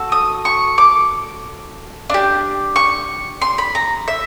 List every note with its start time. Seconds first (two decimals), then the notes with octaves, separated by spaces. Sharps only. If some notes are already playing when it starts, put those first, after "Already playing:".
Already playing: F#4 A4
0.12 D#6
0.45 C#6
0.78 D6
2.10 D4 G4
2.76 C#6
3.42 C6
3.58 B5
3.75 A#5
4.08 E5